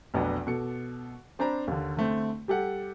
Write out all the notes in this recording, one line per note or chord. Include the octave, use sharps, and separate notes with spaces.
F1 B1 B3 D4 D6
B2 A4 C#7
C4 D4 C5 D5 A#5 B5
D#2 D3
D3 A3 C4
G3 G4 A4 F#5